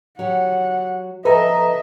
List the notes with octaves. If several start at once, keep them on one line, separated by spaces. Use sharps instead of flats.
F#3 G4 F#5
F2 A4 B4 D#5 E5 G#5 A#5